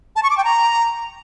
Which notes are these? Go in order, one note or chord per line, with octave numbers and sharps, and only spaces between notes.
A5
C#6
D6
G5
A#5